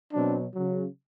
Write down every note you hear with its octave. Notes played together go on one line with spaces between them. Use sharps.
B2 F#3 C4 D4
F#3
C#3